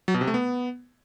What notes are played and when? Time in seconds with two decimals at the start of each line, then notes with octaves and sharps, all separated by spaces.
0.08 F#3
0.14 B2
0.21 C3
0.27 A3
0.34 B3